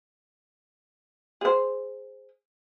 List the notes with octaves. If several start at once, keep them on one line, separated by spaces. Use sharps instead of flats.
G#4 C5